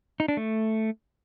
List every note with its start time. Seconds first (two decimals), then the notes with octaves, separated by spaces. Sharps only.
0.20 D#4
0.28 D4
0.37 A3